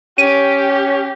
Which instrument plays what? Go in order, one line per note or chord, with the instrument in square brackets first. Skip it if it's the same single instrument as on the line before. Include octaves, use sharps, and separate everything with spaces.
[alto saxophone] C#4 [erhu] G4 [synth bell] D#7